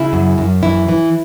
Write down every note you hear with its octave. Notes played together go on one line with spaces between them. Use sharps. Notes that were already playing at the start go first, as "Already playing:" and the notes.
Already playing: C#3 E4
F#2
F#2
E3 E4
E3